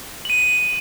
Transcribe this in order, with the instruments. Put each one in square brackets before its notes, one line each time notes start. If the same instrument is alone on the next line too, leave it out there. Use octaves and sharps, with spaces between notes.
[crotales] D#7 F#7